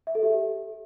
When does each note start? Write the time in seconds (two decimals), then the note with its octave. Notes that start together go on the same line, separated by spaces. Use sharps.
0.07 E5
0.15 A4
0.23 G4